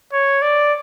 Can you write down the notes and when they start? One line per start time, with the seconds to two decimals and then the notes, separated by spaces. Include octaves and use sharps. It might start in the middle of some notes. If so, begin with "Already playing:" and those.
0.13 C#5
0.42 D5